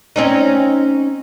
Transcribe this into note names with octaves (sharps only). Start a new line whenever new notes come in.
C4 C#4 D#4